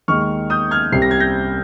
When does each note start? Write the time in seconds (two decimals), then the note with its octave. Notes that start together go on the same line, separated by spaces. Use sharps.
0.08 D#2 D#3 G#3 C#6 F6
0.50 D#6 G6
0.71 F6 G#6
0.92 C2 C3 G3 C7
1.02 A#6
1.11 G#6
1.20 G6 A#6